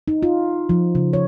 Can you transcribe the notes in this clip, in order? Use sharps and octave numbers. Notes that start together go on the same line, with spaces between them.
D#4
F4
F3
C#3
C#5